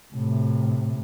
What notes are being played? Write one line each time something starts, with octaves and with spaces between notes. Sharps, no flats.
A2 C3